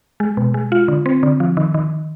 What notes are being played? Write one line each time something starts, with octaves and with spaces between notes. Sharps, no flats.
G#3
B2
G#3
F4
D3
C4
D3
F3
D#3
D#3